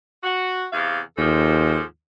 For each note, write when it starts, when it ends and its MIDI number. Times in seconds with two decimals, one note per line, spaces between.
0.23 0.66 66
0.72 1.00 40
0.72 1.00 48
0.72 1.00 77
1.18 1.78 39
1.18 1.82 44
1.18 1.82 53
1.18 1.82 69